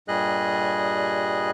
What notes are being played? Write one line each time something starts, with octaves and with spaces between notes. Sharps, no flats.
G2 A#2 G3 G#4 D#5 F#6